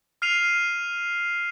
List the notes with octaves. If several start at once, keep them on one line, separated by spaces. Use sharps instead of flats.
F6 C7 D#7 F7